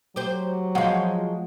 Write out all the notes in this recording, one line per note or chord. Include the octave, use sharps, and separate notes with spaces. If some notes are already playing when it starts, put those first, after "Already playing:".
F#3 G4 C5
F3 G#3 F#4 F5 F#5